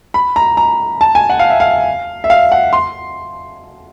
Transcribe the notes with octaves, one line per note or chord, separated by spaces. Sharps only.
B5
A#5
A#5
A5
G#5
F#5
F5
E5
F5
E5
F5
F#5
C6